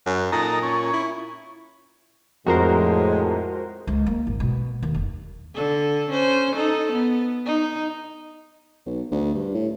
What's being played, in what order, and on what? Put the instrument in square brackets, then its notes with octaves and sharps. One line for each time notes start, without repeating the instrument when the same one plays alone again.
[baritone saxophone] F#2
[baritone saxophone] A#2 [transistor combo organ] D#4 A4 A#5
[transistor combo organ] C#4
[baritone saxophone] E4
[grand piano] F2 A#5 [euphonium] A2 [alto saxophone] G#3 [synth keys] F#4 A#4 C5
[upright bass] C#2
A#3
G#1
B2
D#2
F1
[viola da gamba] D3 A4
C#4 C5
D#4 A4
B3
D#4
[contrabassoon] B1
D2
G2
A2